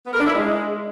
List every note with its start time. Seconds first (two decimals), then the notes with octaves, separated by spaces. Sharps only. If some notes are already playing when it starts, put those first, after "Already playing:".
0.07 B3
0.13 A#4
0.20 D4
0.26 E4
0.33 G#3